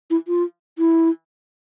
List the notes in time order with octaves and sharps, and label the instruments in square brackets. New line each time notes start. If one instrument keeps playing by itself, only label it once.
[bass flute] E4
F4
E4